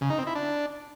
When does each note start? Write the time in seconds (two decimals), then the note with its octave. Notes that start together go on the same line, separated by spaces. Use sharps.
0.01 C#3
0.10 D#4
0.18 C4
0.27 E4
0.35 D4